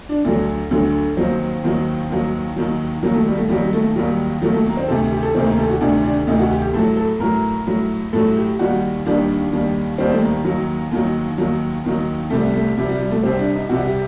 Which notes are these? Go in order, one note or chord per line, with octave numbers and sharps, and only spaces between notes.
D4
D2 D3 F#3 D4
D2 D3 F#3
D#2 D#3 F#3 C4
D#2 D#3 F#3
D#2 D#3 F#3
D#2 D#3 F#3
D#2 D#3 F#3 A#3
A3
G3
A3
D#2 D#3 F#3 G3
A3
D#2 D#3 F#3 G3
D#2 D#3 F#3 A3
A3
A#3
C4
D2 C3 D#3 A4
G4
A4
D2 C3 D#3 C4
A#3
A4
F#4
D2 C3 D#3 D4
D4
D2 C3 D#3 D#4
F#4
G4
G4
A2 F#3 A4
A4
A2 F#3 A#4
A2 F#3
A2 F#3 A4
G4
D#2 D#3 G3 F#4
D#2 D#3 G3 D4
D#2 D#3 G3
D#2 D#3 G3 C4
A3
A#3
D#2 D#3 F#3
D#2 D#3 F#3
D#2 D#3 F#3
D#2 D#3 F#3
C2 C3 G3 A3
A3
C2 C3 G3
G3
G3
A3
C2 C3 G3 C4
D4
D#4
C2 C3 G3 F#4
G4